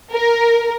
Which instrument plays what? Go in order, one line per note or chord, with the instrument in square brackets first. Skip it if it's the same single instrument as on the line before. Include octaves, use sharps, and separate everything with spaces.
[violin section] A#4